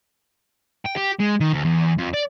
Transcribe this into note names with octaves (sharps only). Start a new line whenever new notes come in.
G5
G4
G#3
D#3
D2
E2
F2
D5